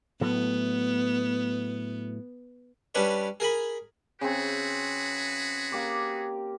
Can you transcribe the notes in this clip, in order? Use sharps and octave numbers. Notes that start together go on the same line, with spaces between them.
A2 F#3 A3 B3
G3 C#4 D4 B4 C#5
G#4 A#4 G#5 B5
C#3 C4 F#4 G#4 B4
A#3 G4 D6